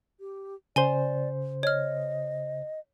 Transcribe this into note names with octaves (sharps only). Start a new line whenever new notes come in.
G4
C#3 C5 D5 G#5 G7
C#5 D#5 F6